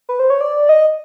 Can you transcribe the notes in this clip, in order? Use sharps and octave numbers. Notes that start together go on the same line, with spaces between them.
B4
C5
C#5
D5
D#5